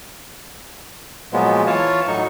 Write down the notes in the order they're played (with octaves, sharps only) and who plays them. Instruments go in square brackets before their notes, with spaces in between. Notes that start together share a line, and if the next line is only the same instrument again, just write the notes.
[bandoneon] A#2 F3 F#3 G#3 B3
E3 F4 C#5 A5
A2 F#3 D#4 C#6